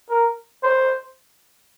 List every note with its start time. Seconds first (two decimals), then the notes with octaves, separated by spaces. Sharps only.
0.10 A#4
0.63 C5